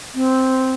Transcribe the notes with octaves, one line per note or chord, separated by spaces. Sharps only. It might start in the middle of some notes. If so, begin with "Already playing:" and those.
C4